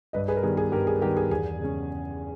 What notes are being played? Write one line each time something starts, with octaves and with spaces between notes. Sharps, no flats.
G2 B4 D#5
G#4 B4
A#4
D#3 G3 B3 G#4
G#4
G2 G4 A#4
G#4
D#3 G3 B3 G4 A#4
G#4
E2 G#4
C#3 G#3 C#4